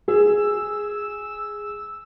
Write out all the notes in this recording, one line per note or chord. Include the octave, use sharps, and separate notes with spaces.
G#4 E6